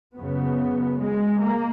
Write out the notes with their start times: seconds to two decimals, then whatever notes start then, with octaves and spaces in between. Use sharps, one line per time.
0.16 F#2 C#3 B3
1.00 G#3
1.42 A#3